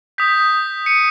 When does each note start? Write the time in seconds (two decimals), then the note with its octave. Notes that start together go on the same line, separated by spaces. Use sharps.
0.18 D#6 G6 B6
0.86 C#7 D#7